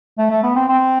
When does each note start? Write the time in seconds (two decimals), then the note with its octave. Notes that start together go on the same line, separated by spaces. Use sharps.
0.18 A3
0.30 A3
0.43 B3
0.55 C4
0.68 C4